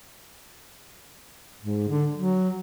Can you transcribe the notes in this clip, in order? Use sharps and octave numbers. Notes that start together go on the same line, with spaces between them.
G#2
D3
F#3